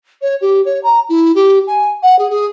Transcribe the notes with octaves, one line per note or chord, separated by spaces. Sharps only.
C#5
G4
C#5
A#5
E4
G4
G#5
F#5
G#4
G#4